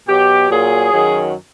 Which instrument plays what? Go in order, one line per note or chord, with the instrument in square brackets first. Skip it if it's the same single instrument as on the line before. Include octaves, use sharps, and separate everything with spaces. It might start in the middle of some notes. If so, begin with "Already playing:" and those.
[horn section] B2 F#3 G4
A#2 F#3 G#4
F#2 D#3 F#3